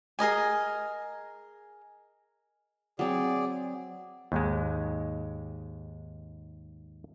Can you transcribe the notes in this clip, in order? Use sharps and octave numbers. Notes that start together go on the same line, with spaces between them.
G#4 A#4 D#5 G#5
F#3 C4 G#4 D5
D#2 G#2 G#3